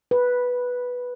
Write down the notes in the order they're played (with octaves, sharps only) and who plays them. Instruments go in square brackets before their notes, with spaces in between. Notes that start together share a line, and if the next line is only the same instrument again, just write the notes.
[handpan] B4